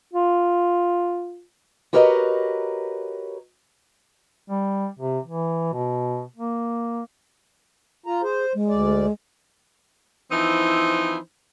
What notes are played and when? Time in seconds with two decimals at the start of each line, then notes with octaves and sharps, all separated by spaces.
0.14 F4
1.93 F#4 G4 A#4 B4 C#5 D#5
4.50 G3
4.99 C3
5.25 E3
5.73 B2
6.36 A#3
8.06 F4 A#5
8.22 G#4 C5
8.54 G#3
8.69 D2 D5
10.31 E3 F3 C4 D#4 E4 C5